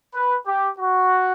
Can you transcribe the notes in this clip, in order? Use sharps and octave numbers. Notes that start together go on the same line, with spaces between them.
B4
G4
F#4